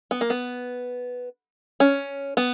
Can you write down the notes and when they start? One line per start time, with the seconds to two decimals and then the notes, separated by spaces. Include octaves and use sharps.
0.11 B3
0.21 A#3
0.30 B3
1.80 C#4
2.37 B3